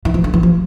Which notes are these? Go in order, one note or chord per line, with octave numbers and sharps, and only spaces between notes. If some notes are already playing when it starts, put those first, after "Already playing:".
E3
F3
D3
E3
F3